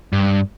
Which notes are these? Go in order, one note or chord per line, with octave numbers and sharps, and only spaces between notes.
G2